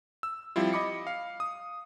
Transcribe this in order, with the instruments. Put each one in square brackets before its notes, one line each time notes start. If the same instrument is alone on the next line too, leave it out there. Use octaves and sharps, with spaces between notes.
[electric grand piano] E6
F3 G3 C4 E4 F4
D#5 B5 D6 C#7
F5
D#6